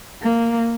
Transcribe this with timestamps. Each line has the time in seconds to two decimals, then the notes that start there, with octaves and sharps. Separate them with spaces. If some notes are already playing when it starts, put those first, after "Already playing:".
0.22 A#3